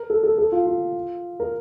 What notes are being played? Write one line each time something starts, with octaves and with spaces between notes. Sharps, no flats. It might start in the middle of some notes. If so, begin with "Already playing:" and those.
Already playing: A#4
A4
A4
A4
F4
F4
A#4